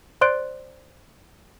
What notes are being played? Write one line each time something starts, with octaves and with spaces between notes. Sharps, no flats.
C5 D5 C6 F#6 D7